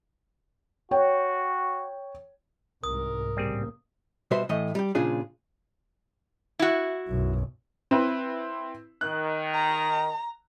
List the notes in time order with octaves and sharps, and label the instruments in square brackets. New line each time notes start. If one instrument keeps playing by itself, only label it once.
[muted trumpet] F#4 [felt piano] C#5 G5
[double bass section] C2 G#2 [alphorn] A#4 [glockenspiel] D#6
[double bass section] A1 C#3 A#3 [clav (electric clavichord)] G3 C4 G#4
[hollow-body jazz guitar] B2 G3 F#4 B4 C5 E5
A2 E3 A3 D#5
G3 G4
A#2 C#3 F3 D4 F4 G#4
[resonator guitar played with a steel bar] E4 F#4
[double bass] B1 F#2
[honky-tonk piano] C4 E4 B4
[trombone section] D#3 [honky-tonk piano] F#6
[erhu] A#5